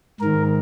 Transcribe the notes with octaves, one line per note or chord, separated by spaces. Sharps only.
G#2 D#3 A#4